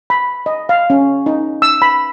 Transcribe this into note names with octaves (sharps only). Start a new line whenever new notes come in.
B5
D#5
F5
C#4
D#4
E6
B5